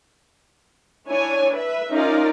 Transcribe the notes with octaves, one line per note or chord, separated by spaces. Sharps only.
D4 E4 C#5 G#5
B4 E5
C#4 D#4 F4 A#4 D5 A#5